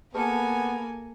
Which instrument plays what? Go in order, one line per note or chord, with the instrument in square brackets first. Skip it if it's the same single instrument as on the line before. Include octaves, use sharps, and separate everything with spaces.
[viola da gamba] A#3 [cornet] B3 [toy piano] G#4 B4 A5 [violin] A4 G#5